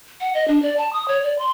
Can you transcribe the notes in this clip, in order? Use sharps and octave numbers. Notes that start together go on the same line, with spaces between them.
F#5
D#5
D4
D5
A5
D#6
C#5
D5
C6